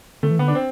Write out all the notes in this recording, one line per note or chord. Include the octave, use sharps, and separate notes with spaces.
D3 A3
E3
D3 B3
D4
C4